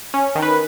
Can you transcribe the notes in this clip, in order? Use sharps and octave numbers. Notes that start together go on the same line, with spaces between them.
C#4
D#3
B4